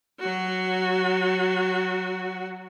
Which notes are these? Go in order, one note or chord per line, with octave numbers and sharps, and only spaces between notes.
F#3 F#4